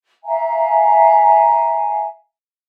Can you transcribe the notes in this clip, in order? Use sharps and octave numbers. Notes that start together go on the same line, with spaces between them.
E5 F5 G#5 A#5